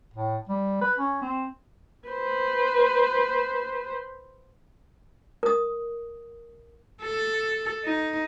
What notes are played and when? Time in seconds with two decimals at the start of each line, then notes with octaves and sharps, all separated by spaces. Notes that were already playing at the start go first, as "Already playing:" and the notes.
0.14 A2
0.49 G3
0.81 B4
0.98 C#4
1.22 C4
2.09 B4 C5
5.43 A#4 D#6
7.03 A4
7.84 D#4